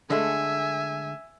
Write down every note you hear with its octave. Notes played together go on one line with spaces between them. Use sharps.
D3 G#3 A3 E5 G#5